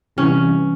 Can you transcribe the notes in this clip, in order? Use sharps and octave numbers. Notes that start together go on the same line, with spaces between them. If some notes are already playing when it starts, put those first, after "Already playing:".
C3 E3 G3 C#4